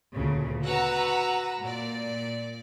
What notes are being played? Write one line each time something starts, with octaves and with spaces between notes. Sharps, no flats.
D2 A#2 C#3
F#4 B4 F#5 A#5 E6
A#2 D5